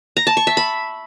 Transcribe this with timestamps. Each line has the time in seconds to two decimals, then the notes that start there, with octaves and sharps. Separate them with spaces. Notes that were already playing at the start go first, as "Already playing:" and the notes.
0.17 A#5
0.27 A5
0.37 C#6
0.47 E5
0.57 B5